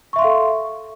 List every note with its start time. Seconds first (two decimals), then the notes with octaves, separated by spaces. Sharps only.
0.13 C#6
0.16 E5
0.19 C6
0.22 F5
0.24 A4